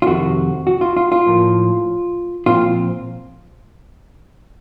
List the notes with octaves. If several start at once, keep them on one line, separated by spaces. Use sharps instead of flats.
F4
F2 C3 D#3 A3 F#4
F#4
F4
F4
F4
A2 F3 A#3
A#2 F3 C4 F4